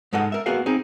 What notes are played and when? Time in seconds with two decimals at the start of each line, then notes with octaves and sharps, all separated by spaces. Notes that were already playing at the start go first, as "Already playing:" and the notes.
0.13 G#2 G#3 A4 D#5 F#5
0.32 A#4 E5
0.46 A#3 B3 F#4 G#4 A#4 F5
0.66 C4 D#4 G#4